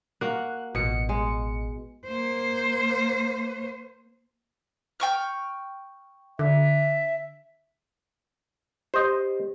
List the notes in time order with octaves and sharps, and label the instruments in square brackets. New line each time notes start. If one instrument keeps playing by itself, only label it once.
[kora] A#3 F#4 [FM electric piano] F#6
[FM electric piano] A1 C#7 [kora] B2
[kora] G#3
[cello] A#3 C5
[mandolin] G5 C#6 F6
[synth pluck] D3 [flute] E5
[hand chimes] G4 [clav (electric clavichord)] C5 D#5